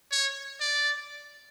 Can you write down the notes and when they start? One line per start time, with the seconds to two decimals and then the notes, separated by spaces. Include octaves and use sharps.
0.12 C#5
0.61 D5